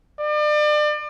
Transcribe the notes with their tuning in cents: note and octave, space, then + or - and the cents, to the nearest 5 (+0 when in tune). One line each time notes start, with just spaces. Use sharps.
D5 +35